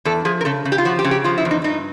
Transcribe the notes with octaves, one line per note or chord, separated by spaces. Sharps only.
E2 A4
F3 G#4
A#4
C#3 A4
C#3
G4
F4
F3 F#4
G4
C#3
G4
F3 F4
E4
E2
D#4
G2 D#4